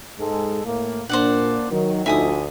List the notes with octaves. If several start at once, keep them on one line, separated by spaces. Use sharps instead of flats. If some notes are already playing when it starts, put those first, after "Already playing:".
G#2 G#3 A4
A2 A#3
A#2 A#3 D4 C5 D5 F#5
D#3 F#3
D2 F3 A3 D#4 E5 G#5 D#6